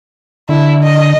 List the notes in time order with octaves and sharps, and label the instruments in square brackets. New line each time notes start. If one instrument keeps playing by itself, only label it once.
[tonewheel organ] D3 [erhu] E4
[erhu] D#5